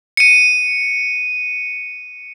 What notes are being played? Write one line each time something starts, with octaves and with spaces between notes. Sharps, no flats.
C#7 D#7